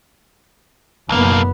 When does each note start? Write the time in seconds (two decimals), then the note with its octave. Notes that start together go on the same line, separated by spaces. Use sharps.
1.09 F#1 B1 A#3 B3